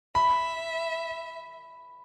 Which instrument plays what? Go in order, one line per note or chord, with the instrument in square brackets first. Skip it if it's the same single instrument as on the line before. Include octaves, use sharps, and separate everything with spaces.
[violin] E5 [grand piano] B5